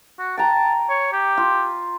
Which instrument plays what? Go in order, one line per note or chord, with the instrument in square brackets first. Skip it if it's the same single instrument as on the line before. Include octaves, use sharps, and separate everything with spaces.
[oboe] F#4
[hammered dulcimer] G5 A#5 [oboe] A5
[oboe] C#5
G4
[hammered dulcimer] F4